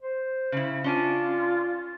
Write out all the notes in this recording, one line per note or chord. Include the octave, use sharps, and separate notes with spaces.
C5
C#3 E4
C#4 D4 F4 G#5